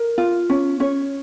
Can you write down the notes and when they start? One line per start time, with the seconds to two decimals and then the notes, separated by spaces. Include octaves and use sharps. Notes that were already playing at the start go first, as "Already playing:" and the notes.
Already playing: A#4
0.18 F4
0.50 C#4
0.80 C#4 C#5